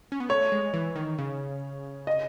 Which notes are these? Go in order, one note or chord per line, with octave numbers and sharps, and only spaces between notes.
C#4
B3
A3 C#5
G#3
E3
D#3
C#3
D#5